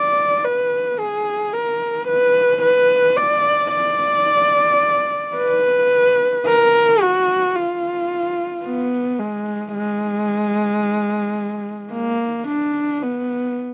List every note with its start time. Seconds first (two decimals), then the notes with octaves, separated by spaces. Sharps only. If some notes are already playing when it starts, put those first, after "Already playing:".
Already playing: D5
0.45 B4
0.99 G#4
1.53 A#4
2.08 B4
2.63 B4
3.17 D5
3.73 D5
5.37 B4
6.46 A#4
7.01 F#4
7.55 F4
8.65 B3
9.19 G#3
9.74 G#3
11.93 A#3
12.48 D4
13.03 B3